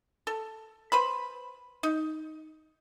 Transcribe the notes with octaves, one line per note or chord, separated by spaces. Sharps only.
A4
B4 C5 B5
D#4